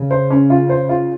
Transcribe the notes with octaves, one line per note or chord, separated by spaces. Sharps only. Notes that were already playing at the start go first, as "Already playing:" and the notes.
Already playing: C#3
C5
C#4
F4
C5
F4